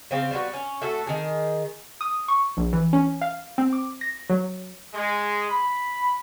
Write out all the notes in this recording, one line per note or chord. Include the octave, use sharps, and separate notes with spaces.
C#3 C4 F5
G3 B3 E4 F#4
C#4
A3 F#4 A4
D#3 G#4
D#6
C#6
A#1
E3
C#4
F5
C4
D6
A#6
F#3
G#3
B5